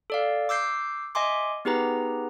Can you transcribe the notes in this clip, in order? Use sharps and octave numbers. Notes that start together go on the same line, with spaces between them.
A4 D5 F5
D6 E6 G6 C7
D#5 E5 G#5 C6 D6
B3 D#4 G4 G#4 B4 A#5